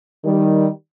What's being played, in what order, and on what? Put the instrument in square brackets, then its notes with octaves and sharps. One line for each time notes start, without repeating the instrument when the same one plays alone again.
[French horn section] D#3 G3